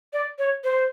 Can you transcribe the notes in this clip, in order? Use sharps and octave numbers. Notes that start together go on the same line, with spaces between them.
D5
C#5
C5